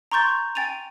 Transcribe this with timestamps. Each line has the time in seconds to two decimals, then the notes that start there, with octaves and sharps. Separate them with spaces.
0.11 A#5 C6 C#6 G6 A6
0.55 G5 G#5 A6 D#7 F7